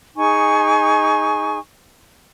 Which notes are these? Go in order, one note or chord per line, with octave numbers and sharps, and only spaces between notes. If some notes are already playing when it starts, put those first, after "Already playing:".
D#4 G#4 G#5 C#6